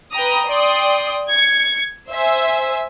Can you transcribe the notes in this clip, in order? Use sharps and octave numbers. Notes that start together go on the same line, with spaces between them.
B4 G5 A#5 D#6
D5 G5 C6 D#6
G#6 C#7
C5 E5 G#5